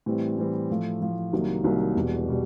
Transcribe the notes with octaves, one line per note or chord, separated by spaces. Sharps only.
A2 E3 G3 C4
A2 E3 G3 C4
A2 F3 A3
A2 F3 A3
C2 C3 D#3 F#3 A#3
C2 C3 D#3 F#3 A#3
E1 E2 B2 G3
B2 G3